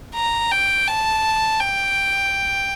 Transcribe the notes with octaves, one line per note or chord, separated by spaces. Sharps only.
A#5
G5
A5
G5